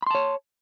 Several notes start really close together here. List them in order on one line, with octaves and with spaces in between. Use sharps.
B5 C6 A5 C#5